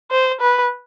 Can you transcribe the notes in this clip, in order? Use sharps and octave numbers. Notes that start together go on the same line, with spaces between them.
C5
B4